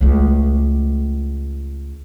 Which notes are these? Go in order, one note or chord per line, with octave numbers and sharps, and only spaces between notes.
C#2 A3